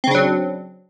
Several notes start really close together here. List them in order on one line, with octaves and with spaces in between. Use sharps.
C4 C#3 D4 F#3